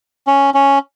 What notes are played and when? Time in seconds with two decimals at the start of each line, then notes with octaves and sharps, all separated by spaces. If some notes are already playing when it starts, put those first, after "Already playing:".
0.27 C#4
0.54 C#4